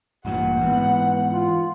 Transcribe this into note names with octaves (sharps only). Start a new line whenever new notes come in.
A1 G2 A#2 F#5
G#2 E3 B3
F4